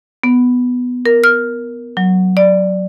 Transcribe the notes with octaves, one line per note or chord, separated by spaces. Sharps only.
B3
A#4
F6
F#3
D5